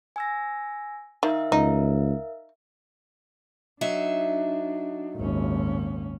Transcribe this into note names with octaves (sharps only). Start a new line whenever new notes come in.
G#5 E6 A#6
D#3 A#4 E5 F5
C#2 D#4
F#3 D4 D#4 E5
G#1 D#2 A#2 C#4